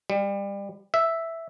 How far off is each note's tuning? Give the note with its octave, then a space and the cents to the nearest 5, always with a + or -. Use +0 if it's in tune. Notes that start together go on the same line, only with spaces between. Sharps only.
G3 +25
E5 +0